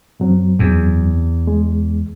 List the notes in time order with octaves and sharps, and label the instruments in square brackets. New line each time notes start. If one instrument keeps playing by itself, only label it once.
[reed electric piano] F#2 F#3 C4
[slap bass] E2
[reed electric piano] G#3